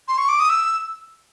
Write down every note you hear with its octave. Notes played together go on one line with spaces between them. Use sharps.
C6
C#6
D6
D#6
E6